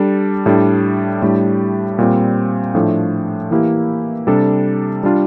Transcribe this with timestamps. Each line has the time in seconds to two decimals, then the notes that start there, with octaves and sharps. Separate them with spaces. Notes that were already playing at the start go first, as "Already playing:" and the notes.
Already playing: G3 D4 A4
0.46 A2 G3 D4
1.22 A2 G3 D4 G4
1.99 A#2 G3 C4
2.75 A2 F3 A3 D4
3.51 E3 A#3 E4 G4
4.27 C3 G3 D4 A4
5.03 G3 D4 F4